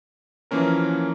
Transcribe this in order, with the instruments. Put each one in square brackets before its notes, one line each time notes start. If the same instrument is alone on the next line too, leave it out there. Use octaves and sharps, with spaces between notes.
[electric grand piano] E3 F3 A#3 C#4 A#4